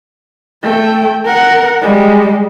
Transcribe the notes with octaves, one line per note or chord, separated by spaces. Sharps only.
A3 G5
A#4 F#5
G3 G#3